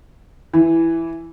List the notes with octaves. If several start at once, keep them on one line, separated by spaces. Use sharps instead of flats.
E3